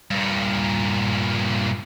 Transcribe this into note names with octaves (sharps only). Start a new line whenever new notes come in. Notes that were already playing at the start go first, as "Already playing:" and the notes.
G2 A#2